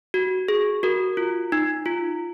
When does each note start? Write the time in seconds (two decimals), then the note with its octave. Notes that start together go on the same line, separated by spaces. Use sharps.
0.14 F#4
0.48 G#4
0.83 F#4 A#4
1.17 F4
1.52 D#4
1.86 F4